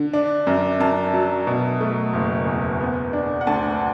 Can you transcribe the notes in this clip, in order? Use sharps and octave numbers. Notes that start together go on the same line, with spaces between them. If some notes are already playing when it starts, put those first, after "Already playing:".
Already playing: D3
D4
F#2
F#2 A5
F#3
B2
A3
F#1
E2
B3
D4
F#5
D2 A5